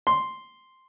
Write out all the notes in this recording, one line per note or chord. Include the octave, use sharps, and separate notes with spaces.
C6